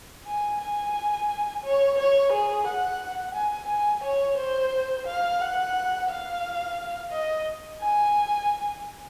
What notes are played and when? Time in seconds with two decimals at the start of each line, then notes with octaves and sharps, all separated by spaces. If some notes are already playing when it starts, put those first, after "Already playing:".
0.27 G#5
0.62 G#5
1.64 C#5
1.98 C#5
2.32 G#4
2.67 F#5
3.34 G#5
3.69 G#5
4.03 C#5
4.37 C5
5.06 F5
5.41 F#5
6.09 F5
7.12 D#5
7.80 G#5